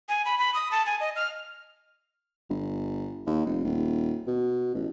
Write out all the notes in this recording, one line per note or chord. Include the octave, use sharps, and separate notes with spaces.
G#5
B5
B5
D#6
A5
G#5
D#5
F6
G1
D#2
F1
D#1
B2
A1